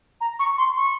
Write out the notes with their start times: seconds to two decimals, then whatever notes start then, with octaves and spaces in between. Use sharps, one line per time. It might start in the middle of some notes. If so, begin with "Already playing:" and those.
0.21 A#5
0.39 C#6
0.58 C6
0.77 C#6